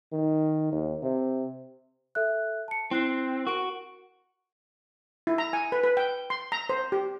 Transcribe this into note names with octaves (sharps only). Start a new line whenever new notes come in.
D#3
D#2
C3
A4 E5 F#6
A5 C#7
C4 E4 F#6 C7
F#4 A#4 D7
E4
A#5
G#5
B4
B4
G5
C6
A#5
C5
G4